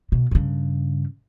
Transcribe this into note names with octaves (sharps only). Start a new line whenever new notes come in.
B2
G2 C#3